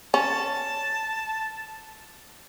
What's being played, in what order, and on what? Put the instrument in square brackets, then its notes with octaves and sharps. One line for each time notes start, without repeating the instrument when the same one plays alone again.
[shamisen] C#4 [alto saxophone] A5